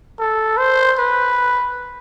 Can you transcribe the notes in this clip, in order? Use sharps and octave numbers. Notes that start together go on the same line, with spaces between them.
A4
C5
B4